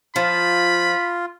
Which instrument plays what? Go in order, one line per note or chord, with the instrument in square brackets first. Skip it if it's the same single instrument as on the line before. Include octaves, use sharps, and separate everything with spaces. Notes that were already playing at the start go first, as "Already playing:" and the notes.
[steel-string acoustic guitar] F3 [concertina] F4 [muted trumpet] B5